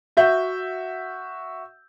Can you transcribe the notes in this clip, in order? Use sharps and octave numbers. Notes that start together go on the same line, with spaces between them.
F#4 E5 G6